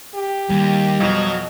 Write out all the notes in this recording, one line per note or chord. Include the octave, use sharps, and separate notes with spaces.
G4
D#2 G3
F2 B2 F3 F#3